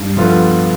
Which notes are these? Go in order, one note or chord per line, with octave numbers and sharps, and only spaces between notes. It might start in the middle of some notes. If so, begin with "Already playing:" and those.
Already playing: G2
D3 F3 B3 F4